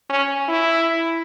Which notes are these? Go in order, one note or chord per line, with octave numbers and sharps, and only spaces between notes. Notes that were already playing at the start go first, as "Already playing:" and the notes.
C#4
E4